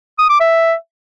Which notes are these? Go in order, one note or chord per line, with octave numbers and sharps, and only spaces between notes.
D#6
D6
E5